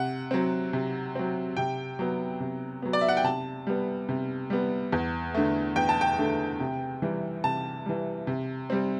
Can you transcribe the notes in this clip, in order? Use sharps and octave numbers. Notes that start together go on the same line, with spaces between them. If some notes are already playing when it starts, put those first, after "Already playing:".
Already playing: C3 F#5
F#3 C4
C3
F#3 C4
C3 G5
F#3 B3
C3
F#3 B3
D5
E5
F#5
G5
C3 A5
G3 B3
C3
G3 B3
E2
D3 A3
E2 G5
A5
G5
D3 A3
C3
E3 G3
C3 A5
E3 G3
C3
G3 C4